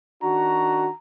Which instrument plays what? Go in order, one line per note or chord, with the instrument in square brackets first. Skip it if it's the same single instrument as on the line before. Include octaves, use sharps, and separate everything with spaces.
[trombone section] D#3 D4 F#4 [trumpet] A#5